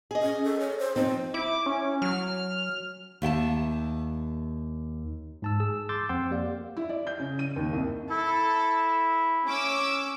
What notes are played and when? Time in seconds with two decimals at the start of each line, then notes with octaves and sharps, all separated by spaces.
0.11 G#4 D#5
0.23 C#4
0.44 A4
0.60 C#5
0.79 C5
0.96 F3 C4 D#4 C5
1.34 E4 D6
1.66 C#4
2.02 F#3 F6
3.22 D#2 E5 G5 A5
5.42 G#2 A5 E6
5.60 G#4 E6
5.89 C6 D6 E6 G6 A6
6.09 F2 C4 F#5 G5 C6 E6
6.31 A#3 G4 D5 F5
6.77 E4
6.89 D5
7.07 G6
7.20 C#3
7.39 D#7
7.56 D#2
7.73 C2
8.11 E4 A4
9.47 C#4 D6 E6